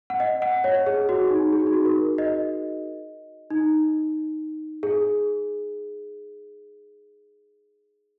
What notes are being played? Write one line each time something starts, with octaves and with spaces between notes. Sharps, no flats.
F#5
D#5
F#5
C#5
G#4
F#4
D#4
G#4
F#4
D#4
F#4
A#4
D#5
D#4
G#4